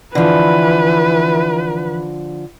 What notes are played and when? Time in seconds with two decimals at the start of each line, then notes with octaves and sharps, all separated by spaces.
0.15 D3 E3 F3 B4